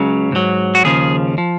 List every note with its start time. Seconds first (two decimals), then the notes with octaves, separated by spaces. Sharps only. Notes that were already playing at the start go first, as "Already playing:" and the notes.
Already playing: C#2 C#3 F#3
0.32 G#2 F#3
0.75 F#4
0.85 D#2 C#3 F3 G#4
1.38 F3